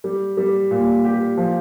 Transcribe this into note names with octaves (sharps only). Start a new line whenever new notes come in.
G3
G3
A#2
G4
F3